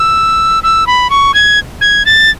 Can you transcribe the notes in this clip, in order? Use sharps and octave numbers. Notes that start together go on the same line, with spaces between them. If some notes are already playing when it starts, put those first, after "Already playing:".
Already playing: E6
E6
B5
C#6
G#6
G#6
A6